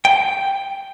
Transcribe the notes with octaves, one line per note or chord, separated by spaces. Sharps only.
G5